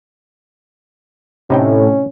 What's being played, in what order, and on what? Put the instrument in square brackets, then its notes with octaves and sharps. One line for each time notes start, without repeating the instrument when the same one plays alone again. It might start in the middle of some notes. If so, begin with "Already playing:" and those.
[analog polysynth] A2 [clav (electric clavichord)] C3 D#4 G5 [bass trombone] C#4